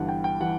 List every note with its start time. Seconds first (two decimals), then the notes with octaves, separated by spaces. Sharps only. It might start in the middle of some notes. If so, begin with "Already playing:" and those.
Already playing: G1 G2 E3 F#5
0.08 G5
0.24 G5
0.41 E3 F#5